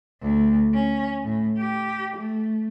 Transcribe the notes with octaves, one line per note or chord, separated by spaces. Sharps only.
D2
C#4
A2
G4
A3